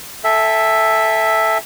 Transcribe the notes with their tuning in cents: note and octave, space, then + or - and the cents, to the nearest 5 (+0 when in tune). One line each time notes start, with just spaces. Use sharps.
A4 +0 E5 +0 G#5 -45